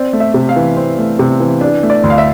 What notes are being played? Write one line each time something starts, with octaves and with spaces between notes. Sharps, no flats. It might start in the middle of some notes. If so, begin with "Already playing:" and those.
Already playing: C4 D5
A3
E5
C3
F5
E3
C4
A3
C3
E3
D4
A3
D5
D2
F5
E5